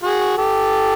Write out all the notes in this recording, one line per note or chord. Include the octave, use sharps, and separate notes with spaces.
F#4 G#4
G4 A4